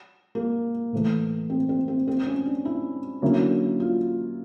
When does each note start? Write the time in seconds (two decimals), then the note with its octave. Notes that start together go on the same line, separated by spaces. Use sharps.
0.35 A#3
0.92 A2 E3 A3
1.50 C4
1.69 C4
1.88 C4
2.08 C4
2.27 C#4
2.45 D4
2.65 E4
3.22 D3 F#3 A#3 C#4 E4
3.80 F4